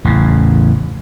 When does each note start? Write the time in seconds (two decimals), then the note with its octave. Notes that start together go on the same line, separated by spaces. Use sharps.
0.05 A1 E2 C#3